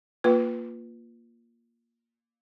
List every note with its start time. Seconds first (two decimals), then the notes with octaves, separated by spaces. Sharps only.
0.24 A#3 F4 B4